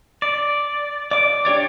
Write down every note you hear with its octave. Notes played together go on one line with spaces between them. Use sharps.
D5
D5 D6
D4 G4 C#5 D5